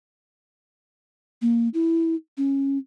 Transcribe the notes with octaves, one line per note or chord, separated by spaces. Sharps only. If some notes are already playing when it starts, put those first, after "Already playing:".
A#3
E4
C#4